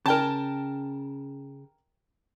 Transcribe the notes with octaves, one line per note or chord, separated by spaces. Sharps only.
C#3 A#4 G5 A5